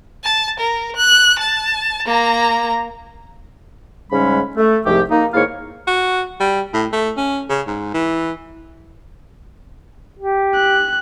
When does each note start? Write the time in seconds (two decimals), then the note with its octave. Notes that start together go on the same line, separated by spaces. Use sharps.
0.24 A5
0.60 A#4
0.96 F#6
1.39 A5
2.06 A#3 A#5
4.11 G#2 C#3 G3 G#3 C#4 B5
4.57 A3
4.85 C2 G#2 F3 A3 G4
5.10 A#3 D#4
5.34 G#2 D#3 A#3 E4 C#5 F5
5.87 F#4
6.40 G3
6.74 A2
6.93 A3
7.17 C#4
7.49 C#3
7.67 G#2
7.94 E3
10.19 G4
10.55 F#6